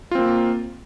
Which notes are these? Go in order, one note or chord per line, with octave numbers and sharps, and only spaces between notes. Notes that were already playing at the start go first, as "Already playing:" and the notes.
A#3 C4 F4